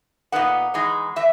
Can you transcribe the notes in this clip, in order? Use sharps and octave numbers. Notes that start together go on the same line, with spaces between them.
A#2 G#3 B3 D#4 F#5
E3 G#3 D#4
E3 E5